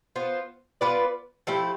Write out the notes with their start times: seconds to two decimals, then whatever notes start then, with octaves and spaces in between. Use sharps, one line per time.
0.16 B3 F4 C5
0.81 B3 F4 B4 D5
1.47 F3 A3 E4 G4